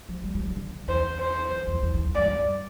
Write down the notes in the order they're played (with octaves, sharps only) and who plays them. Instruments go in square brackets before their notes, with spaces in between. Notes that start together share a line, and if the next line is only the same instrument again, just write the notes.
[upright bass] F3
G3
G3
F3
D3
[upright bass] E2 [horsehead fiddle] C5
[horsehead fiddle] C5
[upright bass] F2
E2
E2
E2
F2
[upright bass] G2 [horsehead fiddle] D5
[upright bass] G2